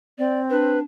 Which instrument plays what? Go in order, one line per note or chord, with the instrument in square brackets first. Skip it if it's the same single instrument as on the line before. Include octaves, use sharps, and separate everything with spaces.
[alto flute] C4 [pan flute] D5
[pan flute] D4 [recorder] B4